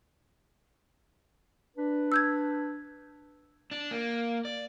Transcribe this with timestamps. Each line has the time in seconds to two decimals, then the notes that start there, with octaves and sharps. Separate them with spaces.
1.77 D4 B4
2.12 E6 G6 G#6
3.71 D4
3.91 A#3
4.45 D5